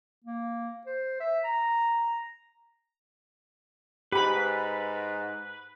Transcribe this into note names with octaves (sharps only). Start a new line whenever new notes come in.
A#3
C5
E5
A#5
G#2 G4 B4 B5